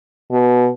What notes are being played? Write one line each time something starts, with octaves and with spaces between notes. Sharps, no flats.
B2